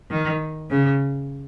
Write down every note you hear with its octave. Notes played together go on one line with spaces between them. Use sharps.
D#3
C#3